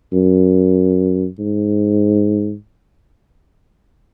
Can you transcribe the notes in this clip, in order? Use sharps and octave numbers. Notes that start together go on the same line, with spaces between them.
F#2
G#2